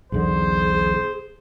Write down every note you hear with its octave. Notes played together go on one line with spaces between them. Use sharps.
B1 E2 D3 G#4 C5